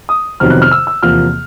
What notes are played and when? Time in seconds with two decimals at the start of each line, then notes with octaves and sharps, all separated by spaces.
0.09 D#6
0.40 F2 C3 D#3 F#3 B3 F6
0.50 F#6
0.62 F6
0.71 E6
0.87 E6
1.03 E2 C3 F3 A#3 F6